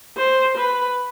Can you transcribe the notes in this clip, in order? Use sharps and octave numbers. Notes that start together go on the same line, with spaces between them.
C5
B4